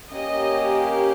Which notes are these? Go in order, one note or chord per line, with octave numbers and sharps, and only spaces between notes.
A#3 C#4 G4 D#5